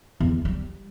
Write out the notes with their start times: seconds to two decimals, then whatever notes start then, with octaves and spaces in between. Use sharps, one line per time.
0.20 E2
0.45 G3